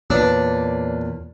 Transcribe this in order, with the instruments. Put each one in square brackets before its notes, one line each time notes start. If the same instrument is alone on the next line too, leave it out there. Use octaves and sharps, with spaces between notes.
[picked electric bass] E2 A#2 [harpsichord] D4 [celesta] B4 C#5